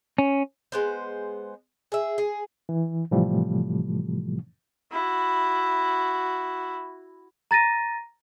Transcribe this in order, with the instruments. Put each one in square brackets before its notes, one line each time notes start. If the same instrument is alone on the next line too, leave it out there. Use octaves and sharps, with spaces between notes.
[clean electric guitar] C#4
[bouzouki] G#3 B3 C5
G#4 E5
G#4
[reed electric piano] E3
A2 C3 E3 F3 G3 A3
[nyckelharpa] E4 F#4
[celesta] A#5 A6 A#6 D#7